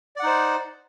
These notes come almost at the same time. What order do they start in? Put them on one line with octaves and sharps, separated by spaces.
D5 F#5 D#4 C5